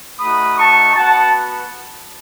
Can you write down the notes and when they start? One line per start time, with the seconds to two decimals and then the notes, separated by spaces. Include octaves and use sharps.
0.20 A3 D#4 F#4 B5 D#6
0.58 A5 C#6
0.95 B3 F#4 F#5 A5